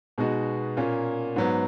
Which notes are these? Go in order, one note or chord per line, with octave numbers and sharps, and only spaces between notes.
B2 G#3 B3 D#4 F#4
A#2 A#3 C#4
G#2 F#3 B3